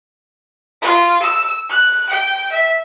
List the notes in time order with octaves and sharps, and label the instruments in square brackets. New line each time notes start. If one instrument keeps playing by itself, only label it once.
[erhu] F4
E6
F#6
G5
E5